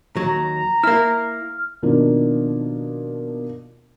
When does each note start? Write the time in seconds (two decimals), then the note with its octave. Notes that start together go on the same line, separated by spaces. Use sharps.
0.16 D#2 F#3 A#5
0.84 A#3 E4 F6
1.82 B2 D#3 F3 A#3 D4